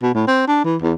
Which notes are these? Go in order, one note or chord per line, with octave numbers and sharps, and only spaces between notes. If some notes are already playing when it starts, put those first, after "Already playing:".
B2
A2
C4
D4
E3
E2